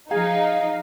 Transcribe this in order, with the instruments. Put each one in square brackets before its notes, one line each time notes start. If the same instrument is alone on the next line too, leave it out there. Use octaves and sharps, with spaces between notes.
[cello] F3 [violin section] D#4 [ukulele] G#4 [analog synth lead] F5